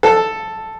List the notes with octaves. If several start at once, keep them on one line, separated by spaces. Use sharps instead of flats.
A4